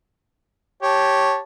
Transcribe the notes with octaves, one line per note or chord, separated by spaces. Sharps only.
G4 C#5 A5